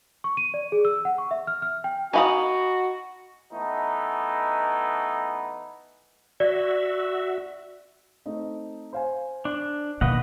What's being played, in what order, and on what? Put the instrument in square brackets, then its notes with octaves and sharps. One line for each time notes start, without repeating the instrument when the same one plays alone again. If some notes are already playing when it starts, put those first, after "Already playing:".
[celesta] C#6
D#7
D5
G#4
E6
F#5
C#6
E5
F6
F6
G5
[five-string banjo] D#4 F5 [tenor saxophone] F#4 [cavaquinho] G#5 B5 D#6
[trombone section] E3 A3 B3 D#4
[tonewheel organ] F#4 E5 [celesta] D5
[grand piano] A3 C4 D#4
C5 F5 G#5
[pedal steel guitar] D4
[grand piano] D#2 F5 [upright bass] B2 [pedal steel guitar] B4 D#5 F#5